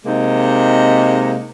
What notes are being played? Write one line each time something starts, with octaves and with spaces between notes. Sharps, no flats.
C3 G#3 A#3 D#4